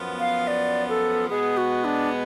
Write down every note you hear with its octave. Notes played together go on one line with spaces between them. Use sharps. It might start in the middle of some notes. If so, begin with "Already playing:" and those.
Already playing: F#2 F3 B3 F4
F5
D5
A4
B2 G#3 B3 G#4
F#4
D4